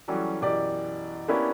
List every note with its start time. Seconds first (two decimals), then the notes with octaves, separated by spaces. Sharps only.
0.08 E3 F#3 G3 A3 C#4
0.41 F#2 B2 E3 G4 D5
1.28 A#3 B3 C#4 D4 E4 G4